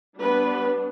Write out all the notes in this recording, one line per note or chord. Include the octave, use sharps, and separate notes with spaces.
G3 B3 D4 B4